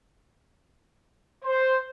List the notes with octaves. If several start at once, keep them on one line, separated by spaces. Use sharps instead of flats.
C5